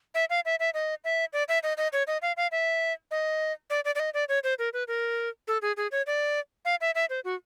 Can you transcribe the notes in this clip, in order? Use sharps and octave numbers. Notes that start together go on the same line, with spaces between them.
E5
F5
E5
E5
D#5
E5
D5
E5
D#5
D#5
C#5
D#5
F5
F5
E5
D#5
D5
D5
D5
D#5
D5
C#5
C5
A#4
B4
A#4
A4
G#4
G#4
C#5
D5
F5
E5
E5
C5
F#4